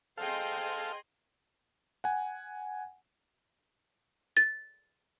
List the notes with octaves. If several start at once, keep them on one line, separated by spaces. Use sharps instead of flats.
G#4 A4 C5 D#5 F5 G5 C6
F#5 G#5
A6